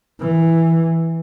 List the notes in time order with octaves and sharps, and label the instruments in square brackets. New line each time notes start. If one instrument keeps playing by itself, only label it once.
[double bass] E3